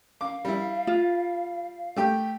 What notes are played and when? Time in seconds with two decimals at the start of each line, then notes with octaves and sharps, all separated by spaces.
0.21 F5 D6
0.45 G3 E4
0.87 F4
1.96 A3 G4 G5